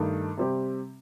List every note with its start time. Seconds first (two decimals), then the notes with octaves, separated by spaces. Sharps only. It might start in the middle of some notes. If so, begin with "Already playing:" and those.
Already playing: G2 D#3 A3
0.37 C3 G3 C4 G4